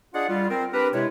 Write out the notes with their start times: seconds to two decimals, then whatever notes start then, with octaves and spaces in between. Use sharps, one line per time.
0.14 D4 F4 G#4 D5 D#5 F#5
0.29 G3 F4
0.50 C4 A#4
0.73 C4 D4 G4 A#4 B4
0.94 C3 G#3 E4 C#5